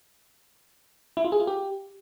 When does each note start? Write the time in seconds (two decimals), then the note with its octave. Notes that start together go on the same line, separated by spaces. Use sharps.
1.17 E4
1.25 F4
1.32 G#4
1.40 F4
1.47 G4